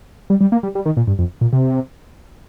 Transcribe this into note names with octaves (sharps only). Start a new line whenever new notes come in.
G3
G3
A#3
G3
G3
D#3
A#2
G2
F2
A#2
C3